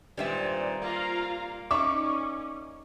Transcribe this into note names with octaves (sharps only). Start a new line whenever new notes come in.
G2 A#2 D#3 G3 C4 E5
A#3 F4 F5 A#5
C#4 D#4 D5 E5 C#6 D6